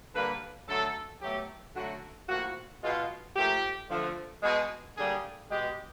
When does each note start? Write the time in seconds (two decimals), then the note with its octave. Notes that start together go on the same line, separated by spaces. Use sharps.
0.14 D3 G3 A#3 B4
0.68 D3 F#3 A3 A4
1.21 B2 F#3 A3 G4
1.74 D3 F#3 A3 F#4
2.28 A2 F3 A#3 F#4
2.82 B2 G#3 F4
3.36 A#2 F3 A3 G4
3.90 D3 F3 A3
4.43 B2 G#3 G#4
4.96 D3 G3 A#3 G#4
5.50 B2 G#3 G4